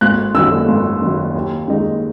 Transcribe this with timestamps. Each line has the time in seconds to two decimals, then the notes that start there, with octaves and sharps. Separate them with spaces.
0.01 G#1 F#6
0.34 F#2 D#3 E6
0.68 G#1
1.02 F#2 D#3
1.35 D#2
1.68 D#3 G#3 D#4